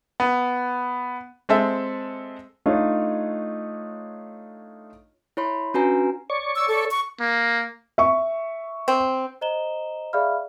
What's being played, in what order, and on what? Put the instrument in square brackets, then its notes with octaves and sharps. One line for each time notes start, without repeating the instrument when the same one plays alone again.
[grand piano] B3
[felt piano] G#3 C4 A4 E5
[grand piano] A3 D4 D#4 F4 C#5
[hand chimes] E4 C#5 B5 C6
C#4 D4 F#4 B4 G#5 A#5
[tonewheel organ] C#5 D5 C#6
[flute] E6
A4
C#6
[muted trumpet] A#3
[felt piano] E5 C#6
[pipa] C4
[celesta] C5 D#5 A#5 E7 G7
G#4 D5 E5 F5 B5 F6